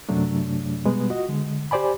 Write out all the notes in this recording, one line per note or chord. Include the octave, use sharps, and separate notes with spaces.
F#2 C3 F#3 A3 D4
B2 G3 G#3 B3 B4
F4 F#4 D#5
D3 G#3
G4 C5 D5 G#5 B5